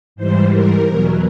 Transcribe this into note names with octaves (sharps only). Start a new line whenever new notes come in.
G#2 E3 G3 C5
A#4
E2 B2 F#3